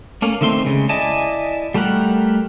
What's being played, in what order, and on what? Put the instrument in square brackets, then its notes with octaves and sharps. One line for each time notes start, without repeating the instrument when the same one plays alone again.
[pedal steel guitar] A3 A#3 C#4
D3 D#3 A3 C4 C6
C#3 G#3
E4 D5 D#5 G#5 A5
G3 A3 G4 A#4 F#5